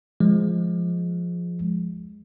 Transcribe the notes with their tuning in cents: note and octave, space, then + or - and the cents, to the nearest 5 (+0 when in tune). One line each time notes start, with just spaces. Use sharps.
F3 +0 G#3 +0